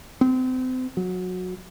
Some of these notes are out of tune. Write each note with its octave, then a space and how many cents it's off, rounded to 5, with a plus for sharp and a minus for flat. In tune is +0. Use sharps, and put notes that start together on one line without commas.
C4 -35
F#3 -20